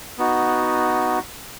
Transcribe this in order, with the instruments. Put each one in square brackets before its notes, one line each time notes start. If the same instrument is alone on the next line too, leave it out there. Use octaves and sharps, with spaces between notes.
[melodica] B3 D#4 F#4